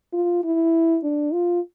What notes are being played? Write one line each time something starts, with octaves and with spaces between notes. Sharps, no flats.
F4
E4
D4
F4